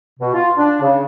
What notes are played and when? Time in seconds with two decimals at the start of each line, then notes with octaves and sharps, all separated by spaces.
0.20 B2
0.34 F4
0.57 D4
0.81 C#3